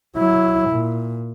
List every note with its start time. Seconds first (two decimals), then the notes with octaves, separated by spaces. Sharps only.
0.17 F#3 E4
0.70 A#2